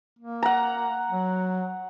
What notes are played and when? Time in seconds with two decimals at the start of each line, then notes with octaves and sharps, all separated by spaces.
0.19 A#3
0.43 F#5 A#5
1.10 F#3